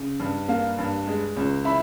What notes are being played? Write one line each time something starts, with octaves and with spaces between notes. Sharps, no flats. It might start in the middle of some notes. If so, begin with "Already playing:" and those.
Already playing: C#3
G2
A#3 F5
G2
G#3
C#2
E4 B5